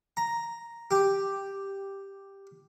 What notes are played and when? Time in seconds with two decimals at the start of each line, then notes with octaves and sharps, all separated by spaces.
0.17 A#5
0.91 G4